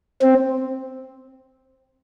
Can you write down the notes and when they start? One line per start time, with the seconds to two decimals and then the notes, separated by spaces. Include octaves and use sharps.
0.22 C4